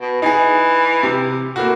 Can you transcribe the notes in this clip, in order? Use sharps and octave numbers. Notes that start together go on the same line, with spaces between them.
B2
E3 D#4 G#4
C3
A2 A#3 F#4